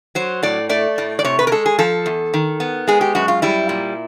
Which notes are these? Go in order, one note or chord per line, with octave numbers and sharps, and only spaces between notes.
F#3 C5
A2 D5
A3 D5
A2
D5
C3 C#5
B4
A#4
G#3 A4
G#4
F3 A4
E2
D#3
B3
G#3 G#4
G4
F#2 F#4
F4
G3 E4
A#2